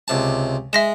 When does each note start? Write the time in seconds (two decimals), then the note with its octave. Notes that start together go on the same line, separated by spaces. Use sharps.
0.08 C#2 C3 A5
0.73 G#3 E5 A#6 E7